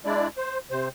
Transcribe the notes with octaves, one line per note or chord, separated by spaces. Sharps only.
G#3 D4 E4 D5
C5
C3 C5